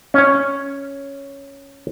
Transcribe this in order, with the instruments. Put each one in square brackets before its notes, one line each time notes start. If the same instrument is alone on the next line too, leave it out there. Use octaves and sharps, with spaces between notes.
[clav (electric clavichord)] C#4 C#5